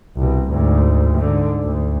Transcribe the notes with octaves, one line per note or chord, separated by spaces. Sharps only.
C2 B2
D2 G#2
G#2 D3
D2